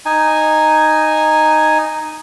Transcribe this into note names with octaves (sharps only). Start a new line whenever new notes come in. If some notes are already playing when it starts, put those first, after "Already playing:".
D#4 G#5